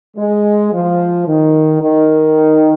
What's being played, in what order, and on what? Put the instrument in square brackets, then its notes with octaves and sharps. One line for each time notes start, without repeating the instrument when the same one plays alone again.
[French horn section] G#3
F3
D#3
D#3